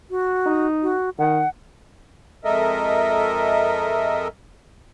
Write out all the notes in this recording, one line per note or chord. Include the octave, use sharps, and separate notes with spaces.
F#4
D#4
F#4
D#3 F#5
F2 G#3 A4 A#4 D#5 E5